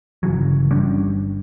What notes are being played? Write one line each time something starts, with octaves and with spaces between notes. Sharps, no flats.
G1 C#3 E3 F#3
G1 G3 C#4 D4